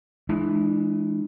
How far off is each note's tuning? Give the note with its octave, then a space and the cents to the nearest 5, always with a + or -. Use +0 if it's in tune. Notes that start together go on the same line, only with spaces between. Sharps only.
E3 +0 G#3 +15 D4 +40